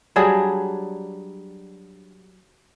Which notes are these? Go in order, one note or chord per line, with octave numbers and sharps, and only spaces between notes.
F#3 G3 D4 G#4